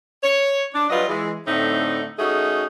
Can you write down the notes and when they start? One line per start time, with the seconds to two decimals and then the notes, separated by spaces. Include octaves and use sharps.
0.24 C#5
0.74 D4
0.90 F#3 G3 F4 B4 D#5
1.09 E3 G#3
1.47 A2 D3 A3 C4 D#4
2.19 A3 C#4 D#4 F#4 G#4